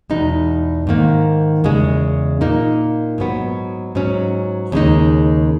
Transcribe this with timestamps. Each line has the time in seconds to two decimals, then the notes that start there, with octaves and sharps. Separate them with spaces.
0.10 E2 B2 G#3 D#4
0.87 G#2 D#3 A#3
1.64 E2 C#3 G#3
2.41 A#2 A#3 D#4
3.18 G#2 F#3 B3
3.95 G#2 F#3 C#4
4.72 D#2 C#3 G#3 D#4